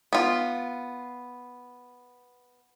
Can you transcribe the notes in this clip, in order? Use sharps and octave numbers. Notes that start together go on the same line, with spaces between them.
B3 F4